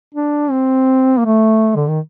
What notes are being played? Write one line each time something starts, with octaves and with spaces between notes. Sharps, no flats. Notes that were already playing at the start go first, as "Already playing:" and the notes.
D4
C4
A#3
A3
D3
D#3